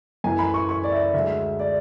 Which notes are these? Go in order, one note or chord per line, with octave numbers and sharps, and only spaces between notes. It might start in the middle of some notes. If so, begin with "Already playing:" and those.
F#2 E3 A3 G#5
B5
C#6
C#6
D5
E5
D2 D3 G#3 E5
D5